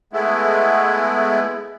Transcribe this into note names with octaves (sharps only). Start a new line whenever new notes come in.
G#3 A3 B3 E4